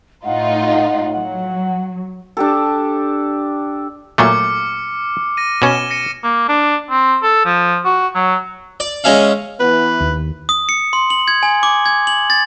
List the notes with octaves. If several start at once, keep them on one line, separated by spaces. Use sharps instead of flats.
A2 D#4 F4 F#5
F#3 F#5
D4 G4 A4
A#2 F#3 A3 D6 F6 C#7
A#6 D#7
B2 C#4 E7 G7
A#6 C#7 D#7
A#3
D4
C4
A4
F3
F#4
F#3
D5
G#3 C#4 G#4 E5 F5
E3 B3 B4
D#2
D#6
C#7
C6
F#7
G#6
G#5
D6
G#6
F#7
A6